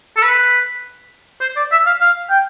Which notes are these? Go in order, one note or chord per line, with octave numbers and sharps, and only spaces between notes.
A4
B4
C5
D5
E5
F5
F5
G5